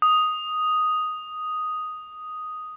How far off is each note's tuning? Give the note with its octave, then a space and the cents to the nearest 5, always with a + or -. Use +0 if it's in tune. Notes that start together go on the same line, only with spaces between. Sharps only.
D#6 +0